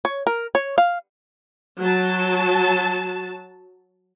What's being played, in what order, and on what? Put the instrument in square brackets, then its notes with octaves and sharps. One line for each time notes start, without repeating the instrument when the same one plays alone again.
[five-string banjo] C#5
A#4
C#5
F5
[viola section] F#3 A5